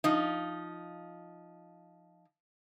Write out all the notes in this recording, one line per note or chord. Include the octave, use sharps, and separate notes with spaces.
F3 D#4